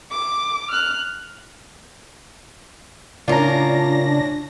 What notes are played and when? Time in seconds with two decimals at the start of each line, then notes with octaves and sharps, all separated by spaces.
0.11 D6
0.71 F6 F#6
3.28 A2 C#3 C#4 D4 F4 A#4 A#5 A#6